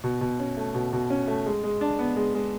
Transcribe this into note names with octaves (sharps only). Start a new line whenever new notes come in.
B2
B2
C#4
A3
B2
B2
C#4
A3
G#3
G#3
D4
B3
G#3
G#3